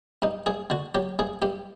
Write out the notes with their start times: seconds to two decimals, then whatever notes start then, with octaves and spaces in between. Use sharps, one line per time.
0.22 G2 D#4
0.46 G2 G#4
0.70 D3 F#4
0.95 F#3 G4
1.19 G2 G#4
1.42 G2 G4